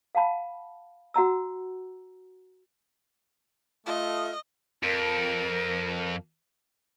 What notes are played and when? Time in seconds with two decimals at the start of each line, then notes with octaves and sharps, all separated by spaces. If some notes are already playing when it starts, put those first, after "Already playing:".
0.15 F5 F#5 A5 B5
1.14 F#4 F#5 A#5 E6
3.86 A3 F4 D#5
4.83 F2 A#4